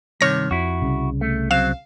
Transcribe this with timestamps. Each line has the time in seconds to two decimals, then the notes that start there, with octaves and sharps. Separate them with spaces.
0.21 G2 C3 D#3 C#5 A#6
0.51 F2 E4 F#4
0.82 C2 C#3
1.21 A3
1.51 F#3 C4 F5 E7